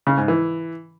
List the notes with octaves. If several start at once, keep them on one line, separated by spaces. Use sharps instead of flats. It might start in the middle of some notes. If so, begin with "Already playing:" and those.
C#3
G#2
E3